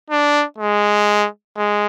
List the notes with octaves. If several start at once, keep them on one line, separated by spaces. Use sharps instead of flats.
D4
G#3
G#3